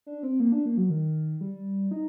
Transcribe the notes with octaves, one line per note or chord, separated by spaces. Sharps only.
D4
C4
A#3
D4
A#3
F#3
D#3
G3
D#4